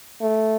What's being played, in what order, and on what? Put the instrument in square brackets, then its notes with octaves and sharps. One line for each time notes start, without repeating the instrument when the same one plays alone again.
[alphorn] A3